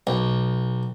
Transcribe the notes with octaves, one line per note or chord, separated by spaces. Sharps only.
B1